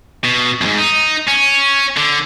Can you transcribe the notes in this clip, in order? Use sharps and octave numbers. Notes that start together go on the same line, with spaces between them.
B2
F2 G#2
D#4
C#4
D3